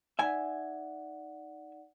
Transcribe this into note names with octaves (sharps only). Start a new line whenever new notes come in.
D#4 D5 E5 F#5 G#5